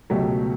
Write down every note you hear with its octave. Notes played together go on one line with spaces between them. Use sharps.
C#2 B2 F#3 A3 G4